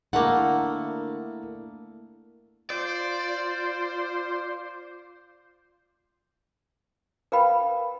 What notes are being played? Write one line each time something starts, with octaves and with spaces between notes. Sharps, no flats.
D3 A3 A#3 E4 A#4 F#5
F4 C5 D5
A#4 B4 F5 G5 B5